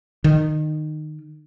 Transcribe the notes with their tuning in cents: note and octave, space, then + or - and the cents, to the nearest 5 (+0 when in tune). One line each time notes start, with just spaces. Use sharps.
D#3 -20